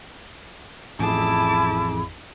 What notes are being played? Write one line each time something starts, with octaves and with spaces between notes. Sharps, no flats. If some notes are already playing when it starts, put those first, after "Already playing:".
A1 F2 E4 G#4 A5 D6